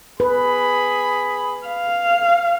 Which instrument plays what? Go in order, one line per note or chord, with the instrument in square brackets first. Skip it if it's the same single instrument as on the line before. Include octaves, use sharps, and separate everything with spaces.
[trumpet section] G#4 B5 [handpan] B4
[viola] F5